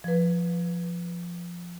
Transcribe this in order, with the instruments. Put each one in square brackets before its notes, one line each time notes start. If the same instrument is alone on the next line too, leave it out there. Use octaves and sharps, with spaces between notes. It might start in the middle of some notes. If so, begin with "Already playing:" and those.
[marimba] F3 B4